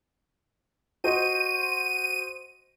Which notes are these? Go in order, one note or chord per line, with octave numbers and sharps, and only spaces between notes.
F#4 C5 D#5 D#7